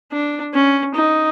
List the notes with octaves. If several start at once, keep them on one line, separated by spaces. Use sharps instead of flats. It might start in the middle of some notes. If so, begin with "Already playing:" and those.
D4
C#4
D#4